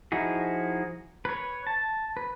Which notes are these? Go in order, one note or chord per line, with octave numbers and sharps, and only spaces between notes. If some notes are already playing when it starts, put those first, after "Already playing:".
F3 D#4 E4 F#4 G#4
B4 C#5
A5
B4